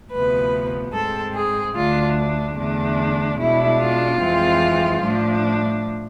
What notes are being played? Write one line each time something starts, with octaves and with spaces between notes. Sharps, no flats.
D2 C3 F3 B3 B4
G#2 G#3 C4 A4
G#4
D2 D3 A3 D4 F4
E2 D3 A3 D4
B2 G#3 D4 E4
F4
F2 E3 G#3 C4
A2 F3 A3 D4